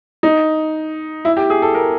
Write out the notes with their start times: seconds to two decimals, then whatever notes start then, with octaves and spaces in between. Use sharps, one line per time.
0.23 D#4
1.25 E4
1.37 G4
1.50 G#4
1.62 A4
1.75 A#4